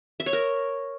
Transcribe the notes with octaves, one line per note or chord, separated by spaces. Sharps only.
E5
C#5
A#4